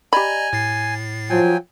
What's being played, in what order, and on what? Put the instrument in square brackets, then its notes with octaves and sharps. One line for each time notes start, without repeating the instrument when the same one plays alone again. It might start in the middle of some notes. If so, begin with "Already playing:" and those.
[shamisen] G4 B5 [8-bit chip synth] D5 D#5 A#5 [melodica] G#5
[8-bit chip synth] A2 A6 C7
[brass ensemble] F3 [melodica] F#3 G5 G#5